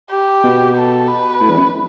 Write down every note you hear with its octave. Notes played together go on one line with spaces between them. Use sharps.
G4
B2
A4
B4
A2
E2
F#2